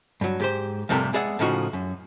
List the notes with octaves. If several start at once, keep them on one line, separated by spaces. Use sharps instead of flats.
G2 F#3
G#2 G4 C5
F2 G#2 C3 G3 A3 A#4
G#3 B3 G#4 D5 E5 F#5
A2 C#3 F3 D#4 F4 F#4
F#2